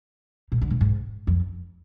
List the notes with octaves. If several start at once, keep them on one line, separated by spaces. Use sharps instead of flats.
A#2
D3
A#2
G#2
F2